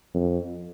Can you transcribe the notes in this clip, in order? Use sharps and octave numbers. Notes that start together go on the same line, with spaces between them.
F2